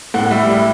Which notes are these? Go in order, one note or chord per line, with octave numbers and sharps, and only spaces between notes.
A2 F#5
G3 E5
G3 E5